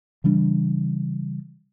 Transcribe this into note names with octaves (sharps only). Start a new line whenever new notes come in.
C#3 E3 G3 D4